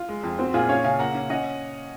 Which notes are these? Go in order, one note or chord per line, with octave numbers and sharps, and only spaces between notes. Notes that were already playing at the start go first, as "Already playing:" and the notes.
Already playing: F4
G#3
F2
C4 F#4
A#2 F4 G#4
C#4 C#5 F5
C#3 F5 G#5
A#3 F#5 A#5
C#4
C#4 D#5 F#5